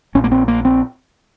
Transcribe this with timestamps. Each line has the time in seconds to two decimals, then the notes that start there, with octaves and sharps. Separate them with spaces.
0.15 A#1 A#2 C#4
0.24 A#3
0.32 C4
0.48 A#3
0.65 C4